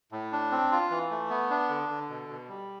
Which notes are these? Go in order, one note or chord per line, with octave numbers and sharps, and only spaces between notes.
A2
D4
C4
F4
E3
A3
B3
D4
D3
D3
B2
B2
G3